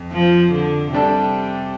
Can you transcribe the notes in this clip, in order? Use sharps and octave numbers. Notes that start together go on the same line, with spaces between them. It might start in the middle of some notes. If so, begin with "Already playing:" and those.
Already playing: F2
F3
D3
C3 G3 D4 A4